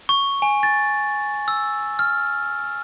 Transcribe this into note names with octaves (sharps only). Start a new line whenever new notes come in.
C#6
G#5
A6
E6
F6